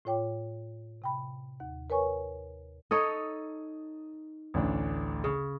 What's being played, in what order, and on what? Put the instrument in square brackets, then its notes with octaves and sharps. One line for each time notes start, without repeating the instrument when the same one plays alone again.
[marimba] A2 F4 C#5 G5 D6
C3 G5 B5
D#2 F#5
A#4 B4 C#5 G#5 C#6
[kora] D#4 A4 C#5 [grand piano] D#6
[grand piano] A1 D2 D4
[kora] C#3